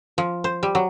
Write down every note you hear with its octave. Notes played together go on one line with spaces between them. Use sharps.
F3
C5
G3
F#3